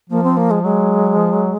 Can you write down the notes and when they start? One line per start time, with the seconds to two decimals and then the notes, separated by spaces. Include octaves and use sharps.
0.10 F3 A#3
0.23 C4
0.36 A#3
0.50 G#3
0.63 F#3 G#3
1.15 F3
1.33 F#3